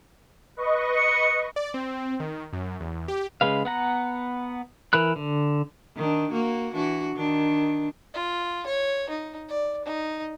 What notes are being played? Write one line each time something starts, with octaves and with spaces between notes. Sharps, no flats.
B4 D#5 C#6
C#7
D5
C4
D#3
F#2
E2
G4
C#3 G#3 B4 F5
B3 F#5 A#5
E3 A#4 B5 F#6
D3
D#3 D4
A#3 F#4
E3 D4 F#4
D#3 D4
F4
C#5
D#4
D5
D#4